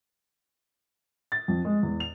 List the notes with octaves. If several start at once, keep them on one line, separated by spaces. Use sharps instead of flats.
A6
F2
G#3
E2
F7